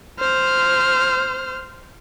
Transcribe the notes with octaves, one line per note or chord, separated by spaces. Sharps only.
C5 F6